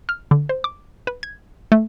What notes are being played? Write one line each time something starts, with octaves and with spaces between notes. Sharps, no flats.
F6
D3
C5
D6
B4
G#6
A3